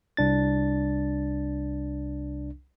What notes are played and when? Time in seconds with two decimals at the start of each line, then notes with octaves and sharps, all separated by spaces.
0.17 C2 D4 A6